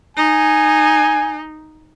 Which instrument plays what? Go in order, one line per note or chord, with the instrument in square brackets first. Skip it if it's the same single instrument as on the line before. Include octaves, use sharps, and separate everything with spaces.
[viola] D#4 [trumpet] G#5